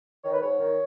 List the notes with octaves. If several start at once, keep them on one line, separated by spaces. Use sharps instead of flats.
D#3 C#5
B4
G#2 C#5
D#3